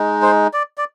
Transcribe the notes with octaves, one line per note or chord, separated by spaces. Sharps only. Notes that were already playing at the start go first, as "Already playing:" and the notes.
Already playing: G#3 D#4
C5
D5
D5